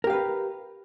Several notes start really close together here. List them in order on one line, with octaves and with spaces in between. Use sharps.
A#4 G4 F5 B4